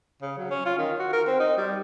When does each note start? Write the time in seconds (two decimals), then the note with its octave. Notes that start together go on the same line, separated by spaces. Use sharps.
0.22 C#3
0.38 F#3
0.51 C#4
0.66 F4
0.78 D#3
0.99 F#4
1.13 A#4
1.27 C4
1.40 D#4
1.57 G3